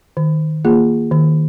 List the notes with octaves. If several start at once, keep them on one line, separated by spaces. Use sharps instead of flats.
D#3
A#3 F4 G#4
D#3